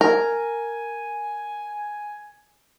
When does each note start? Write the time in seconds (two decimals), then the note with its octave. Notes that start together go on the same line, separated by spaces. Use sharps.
0.01 A#4 G#5